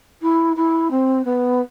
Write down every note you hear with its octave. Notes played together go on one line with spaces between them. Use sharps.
E4
E4
C4
B3